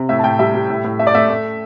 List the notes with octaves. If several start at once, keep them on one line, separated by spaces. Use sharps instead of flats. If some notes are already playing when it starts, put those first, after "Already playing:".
Already playing: C3
A2 E5
A5
A2 G5
G3 E5
G3
A2
A2
A3 E5
D5
A3 E5
A3